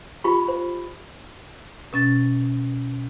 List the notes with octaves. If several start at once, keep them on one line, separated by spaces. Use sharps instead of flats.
F4 G4 B5 C#6
C5
B2 C#4 A6